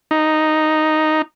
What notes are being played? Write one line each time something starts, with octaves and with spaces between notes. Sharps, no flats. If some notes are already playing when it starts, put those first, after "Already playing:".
D#4